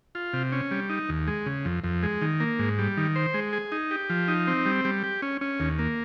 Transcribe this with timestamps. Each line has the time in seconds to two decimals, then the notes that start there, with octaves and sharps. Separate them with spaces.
0.15 F4
0.33 C3
0.52 C#4
0.71 G3
0.90 D#4
1.09 D#2
1.28 G#3
1.46 C#3
1.65 F2
1.84 F2
2.03 G#3
2.21 D#3
2.40 A#3
2.59 G#2
2.78 G3
2.97 D#3
3.16 C5
3.34 G#3
3.53 G#4
3.72 D#4
3.91 G4
4.10 F3
4.28 D#4
4.47 C4
4.66 G3
4.85 G3
5.04 G4
5.22 C#4
5.41 C#4
5.60 D#2
5.79 A#3